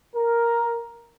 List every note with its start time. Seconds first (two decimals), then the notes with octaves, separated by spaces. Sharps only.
0.14 A#4